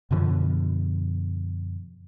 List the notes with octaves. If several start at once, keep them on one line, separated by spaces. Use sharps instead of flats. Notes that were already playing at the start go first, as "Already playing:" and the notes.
F#2 B2 D3 F3